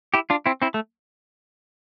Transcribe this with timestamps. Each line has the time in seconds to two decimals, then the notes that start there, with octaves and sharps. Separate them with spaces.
0.14 E4 G4
0.30 D4 F4
0.46 C4 E4
0.62 C4 E4
0.74 A3